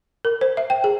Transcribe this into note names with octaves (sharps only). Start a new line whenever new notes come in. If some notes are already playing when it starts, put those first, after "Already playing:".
A#4
C5
E5
G5
G#4